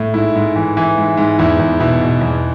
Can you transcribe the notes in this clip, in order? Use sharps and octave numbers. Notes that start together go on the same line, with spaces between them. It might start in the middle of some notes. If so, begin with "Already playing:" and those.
Already playing: A2
G#2 E4
G#2
E3
E3
G#2
G#2
E2 E4
E2 E4
B2 E4
B2
E2